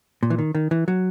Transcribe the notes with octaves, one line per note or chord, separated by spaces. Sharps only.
A#2
E3
D#3
D#3
E3
F#3